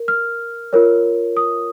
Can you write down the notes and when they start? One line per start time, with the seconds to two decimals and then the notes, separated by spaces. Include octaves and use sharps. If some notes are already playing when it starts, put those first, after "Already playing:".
Already playing: A#4
0.08 F6
0.73 F4 A#4 C#5
1.37 D#6